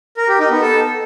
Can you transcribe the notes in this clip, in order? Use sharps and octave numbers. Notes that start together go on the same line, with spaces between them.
A#4
G4
D#4
B3
A4